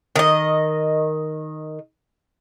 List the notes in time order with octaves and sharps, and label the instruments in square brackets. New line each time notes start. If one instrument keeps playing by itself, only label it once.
[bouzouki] D#3 D#5